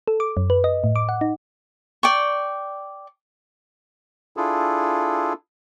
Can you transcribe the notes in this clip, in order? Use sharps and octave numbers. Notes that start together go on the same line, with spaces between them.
A4
D6
F#2
B4
D#5
A2
D6
F#5
D#4
D5 G5 C#6
D4 E4 F4 G#4 A4